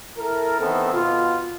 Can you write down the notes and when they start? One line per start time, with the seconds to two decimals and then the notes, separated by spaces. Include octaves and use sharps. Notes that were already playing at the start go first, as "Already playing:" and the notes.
0.16 E4 A4 A#4
0.59 D#3 E3 B3 C4 A4
0.92 B2 F4